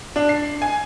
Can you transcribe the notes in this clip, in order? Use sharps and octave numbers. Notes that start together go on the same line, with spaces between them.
D4
C7
G#5